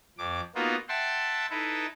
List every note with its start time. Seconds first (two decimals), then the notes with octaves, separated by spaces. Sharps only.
0.18 F2 D6
0.55 A#3 B3 D#4 F4 F#4
0.89 E5 F#5 G5 A5 C6
1.50 D#4 E4 A4 B4